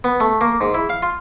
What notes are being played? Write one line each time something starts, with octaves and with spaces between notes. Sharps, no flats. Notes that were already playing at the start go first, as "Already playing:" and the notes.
B3
A3
A#3
G#2
E4
F5
F4